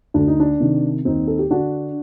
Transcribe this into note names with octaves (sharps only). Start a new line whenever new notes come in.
D2 D4
D#4
D4
C3 D#3
D#2 C4 D#4
A4
G4
D3 D4 F#4